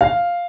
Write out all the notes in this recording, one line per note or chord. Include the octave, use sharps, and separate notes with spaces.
F5